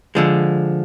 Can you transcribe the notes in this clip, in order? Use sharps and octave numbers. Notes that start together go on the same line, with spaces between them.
D3 F3 G#3